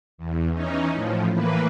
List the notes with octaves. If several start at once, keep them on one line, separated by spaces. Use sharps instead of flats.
E2
E3 C#4 D#4
A2 F3
A2 E3 A#3 B4